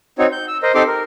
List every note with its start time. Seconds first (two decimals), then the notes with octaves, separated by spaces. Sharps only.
0.18 C4 D#4 F#4 C#5
0.32 G6
0.48 E6
0.63 A#4 C5 D#5
0.75 C4 D#4 G4 A4 C6 D6
0.87 A#4